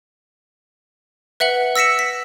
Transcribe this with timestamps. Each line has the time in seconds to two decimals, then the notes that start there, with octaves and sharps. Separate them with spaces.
1.40 B4 E5 F#5 F#7
1.76 E6 A#6 B6 C#7 E7
1.99 B6